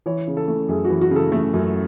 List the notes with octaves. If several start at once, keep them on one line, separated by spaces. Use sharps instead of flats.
E3 C#5
C#3
A4
A3
F#2 G#4
F#4
E3
F#4
C#3
A4
A3
F#2